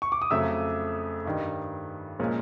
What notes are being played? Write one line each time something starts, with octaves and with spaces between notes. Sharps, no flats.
C#6
D6
D#6
F2 C#3 F#3 A3 E5 E6
G2 D#3 G3
A#2 F3 G#3 C#4